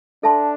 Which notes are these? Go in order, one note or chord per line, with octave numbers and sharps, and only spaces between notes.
D4 A4 E5 A5 C6